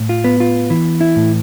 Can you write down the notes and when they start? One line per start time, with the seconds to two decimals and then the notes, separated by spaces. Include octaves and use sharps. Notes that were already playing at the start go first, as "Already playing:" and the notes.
Already playing: A2
0.09 F4
0.24 B3
0.40 F4
0.70 E3
1.01 E4
1.16 A2